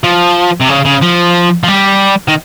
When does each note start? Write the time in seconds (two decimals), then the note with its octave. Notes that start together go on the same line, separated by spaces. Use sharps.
0.04 F3
0.60 C3
0.69 C#3
0.85 C#3
1.02 F3
1.64 F3
1.68 G3
2.28 D#3